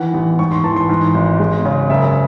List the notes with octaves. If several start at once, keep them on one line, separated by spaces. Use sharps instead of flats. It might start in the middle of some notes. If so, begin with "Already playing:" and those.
Already playing: D#3 E3 F#5
A1
G#2 C#6
C6
E3 A5
C6
G#2
G#1
G#3
C#3
F#1 E5